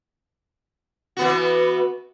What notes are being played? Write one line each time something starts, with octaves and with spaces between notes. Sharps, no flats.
E3 B3 F#4